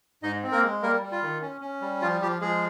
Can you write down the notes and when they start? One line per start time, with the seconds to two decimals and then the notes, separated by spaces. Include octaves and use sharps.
0.23 G#2 D#4 D#5
0.43 C4
0.52 A#3 A#4
0.63 G#3
0.82 G3 A#3 A#4
1.03 G3
1.12 F4
1.23 D#3
1.42 C#4
1.61 C#4
1.82 G3
2.02 F3 F4
2.21 F3 G4
2.41 F3 G#3 G#4